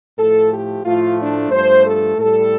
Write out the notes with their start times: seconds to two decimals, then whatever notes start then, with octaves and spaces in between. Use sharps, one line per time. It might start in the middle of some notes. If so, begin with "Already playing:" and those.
0.18 A2 F3 A3 A4
0.52 G4
0.85 A2 F3 A3 F4
1.19 D4
1.51 G2 F3 A3 C5
1.84 A4
2.18 A2 G3 A4